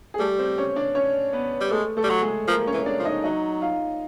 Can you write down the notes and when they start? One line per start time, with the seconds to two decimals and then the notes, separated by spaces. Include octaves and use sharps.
0.14 G#4
0.19 G3 A3 A4
0.38 C4 C5
0.58 C#4 C#5
0.76 D4 D5
0.95 C#4 C#5
1.33 B3 B4
1.61 G3
1.71 G#3 A3 A4
1.97 A3 A4
2.03 G3
2.10 F#3
2.22 G#3 G#4
2.48 F3 A#3 A#4
2.67 C#4 C#5
2.73 E3
2.86 D4 D5
2.99 F3
3.05 D#4 D#5
3.24 F#3 D#4 D#5
3.62 F4 F5